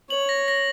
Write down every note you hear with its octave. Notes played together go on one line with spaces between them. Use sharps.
C#5 F#7
A#6
A#6